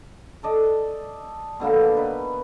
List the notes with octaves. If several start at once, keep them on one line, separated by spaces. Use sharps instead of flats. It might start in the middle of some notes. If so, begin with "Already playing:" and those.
A4 D5 D#5
B2 D3 A#3 B3
D#4 B4